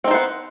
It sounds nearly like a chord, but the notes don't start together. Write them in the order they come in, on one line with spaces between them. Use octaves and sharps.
C4 D#4 C5 B3